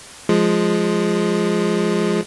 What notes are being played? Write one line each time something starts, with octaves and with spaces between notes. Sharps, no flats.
F3 G#3